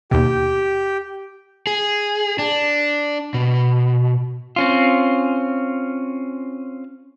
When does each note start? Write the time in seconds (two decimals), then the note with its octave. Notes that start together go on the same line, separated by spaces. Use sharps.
0.11 D#2 B2 G4 G5
1.67 G#4
2.39 D4
3.34 B2
4.56 C4 C#4 F4